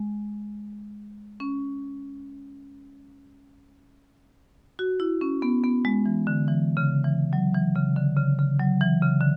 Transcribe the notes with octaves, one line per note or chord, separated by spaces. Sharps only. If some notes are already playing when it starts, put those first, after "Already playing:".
Already playing: G#3
C#4
F#4
E4
C#4
B3
B3
G#3
E3
D3
E3
C#3
E3
F#3
E3
C#3
D3
C#3
C#3
F#3
E3
C#3
D3